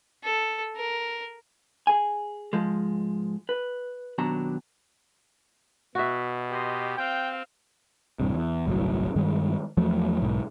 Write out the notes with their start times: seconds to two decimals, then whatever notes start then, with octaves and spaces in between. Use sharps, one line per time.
0.24 A4
0.77 A#4
1.87 G#4 G#5
2.53 G#2 F3 G#3
3.49 B4
4.18 D#2 B2 F#3 D4 A#5
5.95 B2 F#4 E5
6.51 G4 D#5 C6
6.97 C4 F5 G5
8.20 D#1 G2 C3
8.34 E2
8.66 G1 C2 A2 F#3
9.16 G2 D#3 G3 G#3
9.77 E2 F3 F#3 A3
10.22 B1 G#2